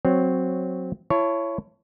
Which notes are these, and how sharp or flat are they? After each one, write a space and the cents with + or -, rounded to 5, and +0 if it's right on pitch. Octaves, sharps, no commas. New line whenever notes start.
F#3 +0 C4 +0 C#5 -5
E4 +35 C#5 +0 A5 +0